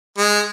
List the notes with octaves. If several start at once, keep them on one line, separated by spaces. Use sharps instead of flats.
G#3